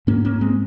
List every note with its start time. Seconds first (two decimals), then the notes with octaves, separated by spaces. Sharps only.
0.07 G#2 A#3 C#4
0.25 A#3 C#4
0.41 G#3 C4